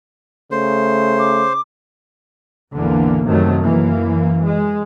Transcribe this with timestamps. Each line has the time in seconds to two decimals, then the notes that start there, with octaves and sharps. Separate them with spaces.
0.52 C#3 A3 C5
1.19 D6
2.74 A1 E2 D3 E3 A#3
3.24 F#2 C3 D#3 F#3 A3
3.63 F#2 E3 A#3
4.43 G#3